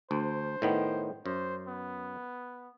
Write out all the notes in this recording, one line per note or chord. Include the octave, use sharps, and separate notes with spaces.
D2 C5
A2 D#3 B3
F#2 C5
B3